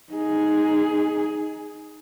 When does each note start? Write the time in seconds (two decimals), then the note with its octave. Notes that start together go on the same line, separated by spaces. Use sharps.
0.13 D#4 G#4